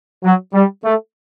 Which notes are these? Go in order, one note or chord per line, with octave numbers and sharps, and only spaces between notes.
F#3
G3
A3